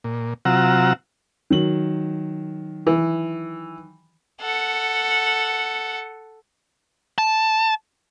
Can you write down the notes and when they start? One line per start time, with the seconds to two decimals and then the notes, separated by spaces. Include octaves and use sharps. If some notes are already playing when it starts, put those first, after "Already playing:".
0.04 A#2
0.45 C3 F#3 F4 F#5 A#5 E6
1.50 D#3 F#3 F#7
2.87 E3
4.41 A4 F#5
7.18 A5